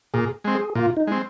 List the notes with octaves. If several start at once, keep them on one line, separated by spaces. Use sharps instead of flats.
A#2 G#4
G#3 C4
G#4
A#2 F4
D#4
G#3 C4